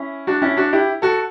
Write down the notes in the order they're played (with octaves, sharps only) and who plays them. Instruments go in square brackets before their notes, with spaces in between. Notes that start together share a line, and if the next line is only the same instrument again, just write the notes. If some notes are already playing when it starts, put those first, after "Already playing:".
Already playing: [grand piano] C#4 E4
D4 F#4
C#4 E4
D4 F#4
E4 G4
F#4 A4